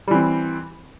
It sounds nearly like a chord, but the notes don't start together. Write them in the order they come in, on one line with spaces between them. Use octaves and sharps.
G3 E3 C4